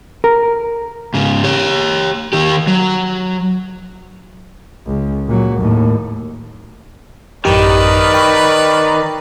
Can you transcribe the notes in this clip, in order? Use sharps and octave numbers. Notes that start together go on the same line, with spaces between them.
A#4
G#2 C#3
G4 C#5
D#3 G4
F#3
C#2
A#2 F#3
D#2 A2
A1 F#2 D#3 G4 B4 D5
G5 B5 C#6